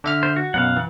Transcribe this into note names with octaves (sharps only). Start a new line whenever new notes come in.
D3 E5 F6
C5
F#4
F#2 B2 F5 F#5
E3